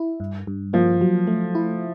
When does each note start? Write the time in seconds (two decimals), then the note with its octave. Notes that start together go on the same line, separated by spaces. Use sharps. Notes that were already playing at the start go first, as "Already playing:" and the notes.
Already playing: E4
0.20 G2
0.47 G2
0.73 F3 A#3
1.01 F#3
1.27 A3
1.55 E4